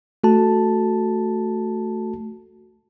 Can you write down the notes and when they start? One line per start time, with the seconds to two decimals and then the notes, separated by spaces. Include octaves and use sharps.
0.24 A3 F#4 A4 A5